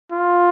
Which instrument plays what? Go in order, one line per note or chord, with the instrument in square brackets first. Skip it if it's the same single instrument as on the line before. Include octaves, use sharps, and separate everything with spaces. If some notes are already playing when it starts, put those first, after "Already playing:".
[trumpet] F4